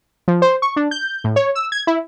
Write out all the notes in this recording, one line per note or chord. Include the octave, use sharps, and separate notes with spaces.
F3
C5
C#6
D4
G6
A2
C#5
E6
G#6
E4